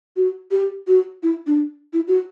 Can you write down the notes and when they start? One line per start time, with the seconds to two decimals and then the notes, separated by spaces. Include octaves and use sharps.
0.16 F#4
0.51 G4
0.88 F#4
1.23 E4
1.47 D4
1.93 E4
2.08 F#4